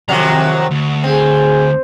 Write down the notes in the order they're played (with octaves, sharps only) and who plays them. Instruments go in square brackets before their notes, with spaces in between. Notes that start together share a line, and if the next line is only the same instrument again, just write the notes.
[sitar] F2 C3 F#3 [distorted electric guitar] D#3 A#5
[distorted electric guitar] D2
[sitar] C4 [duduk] G#4